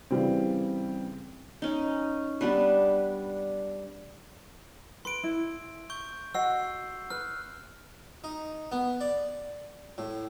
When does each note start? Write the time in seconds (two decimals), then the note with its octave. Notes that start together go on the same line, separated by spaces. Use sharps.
0.11 C#3 E3 G3 C4
1.62 C#4 D#4
2.41 G3 B3 D4 B4
5.05 B4 C6 D7
5.24 E4
5.90 C#6 G6 G7
6.34 F#4 D#5 F#5 E6 C7
7.10 B4 F6
8.24 D#4
8.72 B3
9.01 D5
9.98 A2